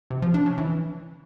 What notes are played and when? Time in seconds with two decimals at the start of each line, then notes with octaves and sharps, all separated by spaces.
0.10 C3
0.22 F3
0.34 D4
0.46 C#3
0.58 E3